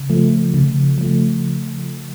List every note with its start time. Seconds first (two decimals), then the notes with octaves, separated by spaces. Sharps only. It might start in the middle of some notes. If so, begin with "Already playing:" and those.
Already playing: C#3
0.10 F3 A3
0.54 C#3
0.98 F3 A3